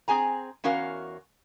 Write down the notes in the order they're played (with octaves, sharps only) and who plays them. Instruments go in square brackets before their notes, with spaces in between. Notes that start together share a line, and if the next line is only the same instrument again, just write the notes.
[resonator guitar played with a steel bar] C4 G#4 G#5 A#5
E2 C#4 F#4 A#4 F5